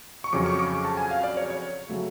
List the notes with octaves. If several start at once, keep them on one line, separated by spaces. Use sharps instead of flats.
C#6
F2 C#3 F#3 C#4 D6
C#6
D6
C#6
A5
G#5
F5
D5
C#5
C#5
C#3 F#3 A3